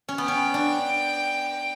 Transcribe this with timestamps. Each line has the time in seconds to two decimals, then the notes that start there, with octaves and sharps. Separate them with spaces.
0.09 C#4
0.18 B3 G5
0.28 C#4
0.54 D4